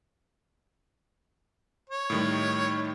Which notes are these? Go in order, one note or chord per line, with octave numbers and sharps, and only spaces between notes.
C#5
A2 D#3 G3